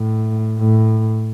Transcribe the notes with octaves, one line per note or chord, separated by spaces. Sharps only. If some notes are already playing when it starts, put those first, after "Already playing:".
Already playing: A2
A2